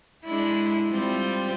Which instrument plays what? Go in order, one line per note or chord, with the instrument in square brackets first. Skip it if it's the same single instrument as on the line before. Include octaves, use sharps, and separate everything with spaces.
[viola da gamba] G#3 D4 E4
G3 C4 F4